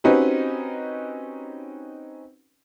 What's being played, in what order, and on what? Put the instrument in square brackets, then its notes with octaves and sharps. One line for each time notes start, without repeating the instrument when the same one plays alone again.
[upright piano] C4 C#4 D#4 F#4 G4 B4